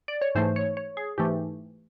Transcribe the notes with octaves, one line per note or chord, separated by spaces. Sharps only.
D5
C#5
G#2 E3 A3 C5
C#5
C#5
G#4
G#2 E3 A3 G4